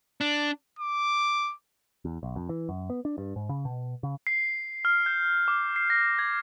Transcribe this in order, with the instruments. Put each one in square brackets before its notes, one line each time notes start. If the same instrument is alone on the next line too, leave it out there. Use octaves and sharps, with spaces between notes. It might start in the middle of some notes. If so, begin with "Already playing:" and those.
[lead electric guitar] D4
[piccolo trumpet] D6
[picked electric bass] E2
B1
F2
E3
F#2
B3
D4
G2
G#2
C#3
B2
C#3
[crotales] C7
F6
G6
D6
C7
A#6
G#6